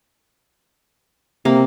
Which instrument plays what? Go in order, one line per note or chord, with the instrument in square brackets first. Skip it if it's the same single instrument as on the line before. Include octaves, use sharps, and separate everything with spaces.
[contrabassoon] C3 [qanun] A#3